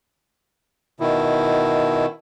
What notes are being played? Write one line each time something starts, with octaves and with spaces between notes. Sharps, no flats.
B2 D#3 E4